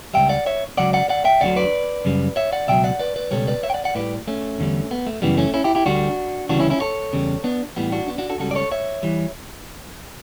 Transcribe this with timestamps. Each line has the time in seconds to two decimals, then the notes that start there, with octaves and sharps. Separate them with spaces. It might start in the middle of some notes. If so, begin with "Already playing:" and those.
0.14 C#2 B2 G3 E5 G5
0.29 D5 F#5
0.46 C#5 E5
0.77 C#2 C#3 F#3 D5 F#5
0.93 D5 F#5
1.09 D5 F#5
1.25 E5 G5
1.41 D2 D3 F#3 D5 F#5
1.56 B4 D5
2.05 F#2 C#3 G3
2.36 C#5 E5
2.53 D5 F#5
2.68 C#2 B2 F#3 E5 G5
2.84 D5 F#5
2.99 B4 D5
3.16 B4 D5
3.31 C#2 B2 G3 A4 C#5
3.47 B4 D5
3.63 C#5 E5
3.70 G5
3.74 D5 F#5
3.84 D5 F#5
3.95 A2 G3 B4 D5
4.28 A3 C#4
4.58 E2 D3 G3
4.91 B3
5.07 A3
5.22 F#2 C#3 E3 G3 B3
5.37 A3 C#4
5.54 C#4 E4
5.64 E4 G4
5.75 E4 G4
5.86 D2 D3 G3 D4 F#4
6.49 D2 C#3 E3 G3 D4 F#4
6.60 C#4 E4
6.70 C#4 E4
6.81 A4 C#5
7.13 E2 C#3 G3
7.44 B3 D4
7.76 A2 E3 G3 B3
7.92 D4 F#4
8.08 B3 D4
8.18 D4 F#4
8.30 F#4 A4
8.40 C#2 C#3 G3 F#4 A4
8.51 D5
8.55 A4 C#5
8.72 C#5 E5
9.03 E3 G3